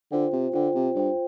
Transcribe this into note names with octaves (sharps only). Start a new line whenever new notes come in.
D3 F4 C5 G5
C3
D3 F4 C5 G5
C3
G2 F4 C5 G5